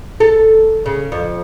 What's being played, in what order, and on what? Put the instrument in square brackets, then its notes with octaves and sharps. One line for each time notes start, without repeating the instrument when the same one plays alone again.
[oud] A4
C#3
F2